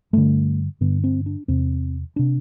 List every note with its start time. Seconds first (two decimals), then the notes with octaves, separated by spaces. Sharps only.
0.13 G2 D3 A3
0.81 G2 D3 B3
1.04 C4
1.26 D4
1.48 E2 C3 C4
2.16 C3 D4